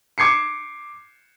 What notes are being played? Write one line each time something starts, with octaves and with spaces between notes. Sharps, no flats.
D6 G#6 C7 C#7